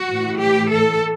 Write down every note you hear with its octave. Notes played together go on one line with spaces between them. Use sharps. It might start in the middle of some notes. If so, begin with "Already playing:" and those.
Already playing: F#4
A2 E3
G4
A4